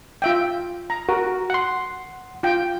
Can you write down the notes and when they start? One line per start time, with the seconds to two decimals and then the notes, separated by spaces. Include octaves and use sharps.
0.22 F4 E5 G5
0.90 A#5
1.09 F#4 A#4
1.50 F#5 C6
2.43 F4 G5